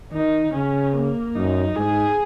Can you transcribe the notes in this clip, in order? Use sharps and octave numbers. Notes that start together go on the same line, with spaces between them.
D#3 D#4
C#3 C#4
A#3
F#2 D#4
G#2 G#4